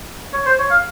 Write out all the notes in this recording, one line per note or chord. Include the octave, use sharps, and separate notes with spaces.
C#5
C5
C#5
F5